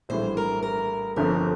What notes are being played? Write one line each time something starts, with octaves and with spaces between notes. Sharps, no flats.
A#1 A2 E3 G3 C5
A#4
A#4
G1 F2 D3 F3 C4 A#4